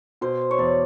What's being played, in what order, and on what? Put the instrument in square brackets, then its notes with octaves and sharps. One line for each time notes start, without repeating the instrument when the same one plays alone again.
[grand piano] B2 [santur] C5
[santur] C#5
[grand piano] E2 [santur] D5